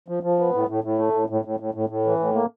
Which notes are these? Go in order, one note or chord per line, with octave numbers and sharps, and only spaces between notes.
F3
F3
B3
A2
A2
A2
A3
A2
A2
A2
A2
A2
A2
E3
A2
A#3